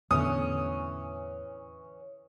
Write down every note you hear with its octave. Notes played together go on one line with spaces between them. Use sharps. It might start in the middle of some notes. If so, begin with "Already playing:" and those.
E2 A2 D3 E3 C#4 D#6